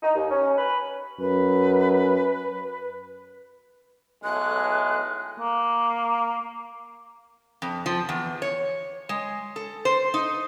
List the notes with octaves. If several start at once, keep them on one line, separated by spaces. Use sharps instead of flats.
D#4
D#2
C#4
B4
F#2 B4
B1 A2 G#3 F#6
A#3
F2
F3
E2
C#5
G#3
A4
C5
D#4